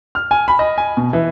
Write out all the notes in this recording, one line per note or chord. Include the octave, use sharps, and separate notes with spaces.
F6
G#5
B5
D#5
G#5
B2
E3